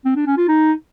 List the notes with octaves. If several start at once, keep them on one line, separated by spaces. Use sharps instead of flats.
C4
D4
C#4
F4
D#4